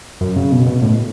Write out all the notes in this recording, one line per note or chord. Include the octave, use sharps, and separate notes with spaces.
F#2
C#3
B2
B2
A2